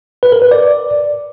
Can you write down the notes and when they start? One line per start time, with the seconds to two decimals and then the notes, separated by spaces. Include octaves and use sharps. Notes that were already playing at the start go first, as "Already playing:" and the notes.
0.23 B4
0.32 A#4
0.42 B4
0.51 D5